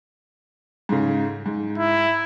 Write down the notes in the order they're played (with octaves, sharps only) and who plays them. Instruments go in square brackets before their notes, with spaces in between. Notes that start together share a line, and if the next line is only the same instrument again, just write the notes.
[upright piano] G#2 C#3
G#2
[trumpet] E4